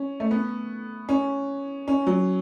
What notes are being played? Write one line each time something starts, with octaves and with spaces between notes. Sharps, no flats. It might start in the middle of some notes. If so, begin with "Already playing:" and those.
Already playing: C#4
A3
B3
C#4
C#4
F#3